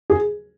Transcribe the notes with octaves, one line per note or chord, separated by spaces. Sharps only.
G#4